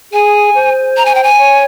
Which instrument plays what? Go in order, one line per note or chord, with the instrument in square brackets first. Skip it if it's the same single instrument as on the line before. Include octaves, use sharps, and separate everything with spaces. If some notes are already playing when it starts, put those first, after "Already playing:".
[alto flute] G#4 [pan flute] G#5
[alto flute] C5
[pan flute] A#5
G#5
G5
G#5
[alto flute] C#5